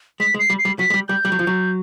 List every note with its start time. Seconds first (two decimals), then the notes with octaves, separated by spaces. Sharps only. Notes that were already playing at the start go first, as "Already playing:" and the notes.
0.20 G#3 B6
0.34 G#3
0.39 C7
0.50 G3
0.59 C7
0.65 G3
0.79 F#3 B6
0.90 G#3
0.94 G3
1.09 G3 G6
1.25 G3
1.32 F#3
1.39 F3
1.47 F#3